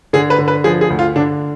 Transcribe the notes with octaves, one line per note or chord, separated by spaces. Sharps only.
D3 G#4
B4
D3
B4
F3 G#4
G#4
D2
F4
D3 D4